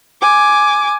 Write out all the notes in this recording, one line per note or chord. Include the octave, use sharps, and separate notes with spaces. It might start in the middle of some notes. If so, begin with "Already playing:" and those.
G#5 D6